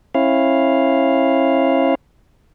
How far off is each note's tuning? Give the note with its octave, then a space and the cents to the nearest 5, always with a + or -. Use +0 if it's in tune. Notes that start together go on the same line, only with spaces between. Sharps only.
C#4 -40 E4 +0 F5 +0